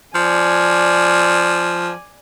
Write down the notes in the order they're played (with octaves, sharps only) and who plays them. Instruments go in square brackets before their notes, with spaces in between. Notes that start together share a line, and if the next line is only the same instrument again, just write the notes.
[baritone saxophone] F3 [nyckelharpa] D5 G#5